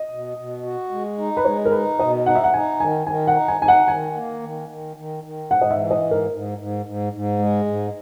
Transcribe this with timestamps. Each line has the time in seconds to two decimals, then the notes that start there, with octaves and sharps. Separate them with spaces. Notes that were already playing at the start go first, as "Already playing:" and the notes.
Already playing: D#5
0.10 B2
0.37 B2
0.64 F#4
0.91 G#3
1.18 D#4
1.37 B4
1.45 G#3 C#5
1.65 A#4
1.72 D#4 B4
1.99 B2 D#5
2.26 D#4 F#5
2.35 E5
2.44 F#5
2.54 D#4 G#5
2.80 D#3 G#5
3.07 D#3 G#5
3.27 F#5
3.34 D#4
3.48 G#5
3.61 D#4 G#5
3.68 F#5
3.88 D#3 G#5
4.15 A#3
4.42 D#3
4.69 D#3
4.96 D#3
5.24 D#3
5.50 G#2 F#5
5.61 D#5
5.71 E5
5.78 E3
5.91 D#5
6.04 G#2
6.11 A#4
6.32 G#2
6.58 G#2
6.86 G#2
7.13 G#2
7.39 G#3
7.66 G#2